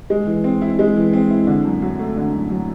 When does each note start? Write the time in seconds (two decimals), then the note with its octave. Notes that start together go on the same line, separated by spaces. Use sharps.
0.10 G#3
0.27 E3
0.44 C4
0.62 E4
0.79 G#3
0.96 E3
1.13 C4
1.30 E4
1.47 D3
1.65 F#2
1.82 F#3
1.99 A3
2.17 D3
2.34 F#2
2.51 F#3